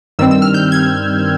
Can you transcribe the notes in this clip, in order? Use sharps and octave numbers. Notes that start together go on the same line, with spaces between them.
G2 D#3 G3 C4 E6
E6
F6
G6
G#6